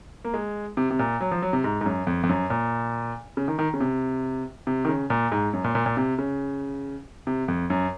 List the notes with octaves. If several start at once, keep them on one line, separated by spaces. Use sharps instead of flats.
A#3
G#3
C3
C3
A#2
F#3
F3
F#3
C3
G#2
G#2
F#2
F2
F2
F#2
A#2
C#3
D#3
D#3
C#3
C3
C3
D#3
C#3
A#2
G#2
F#2
A#2
A#2
A#2
C3
C#3
C3
F2
F#2